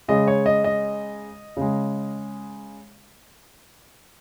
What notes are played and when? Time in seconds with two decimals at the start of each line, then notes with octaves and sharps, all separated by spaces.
0.08 C#3 G#3 D#5
0.27 C#5
0.46 D#5
0.64 D#5
1.57 C#3 G#3